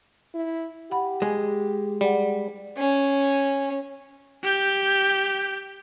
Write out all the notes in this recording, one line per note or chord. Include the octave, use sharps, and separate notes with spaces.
E4
G4 F#5 B5
G#3 G#5
G3 G#4 F#5
C#4
G4 G6